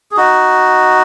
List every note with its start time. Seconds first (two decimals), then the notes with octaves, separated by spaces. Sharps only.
0.11 G#4
0.17 D#4 F#4